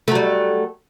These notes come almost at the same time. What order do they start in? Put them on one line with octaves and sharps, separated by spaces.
A3 F#3 G3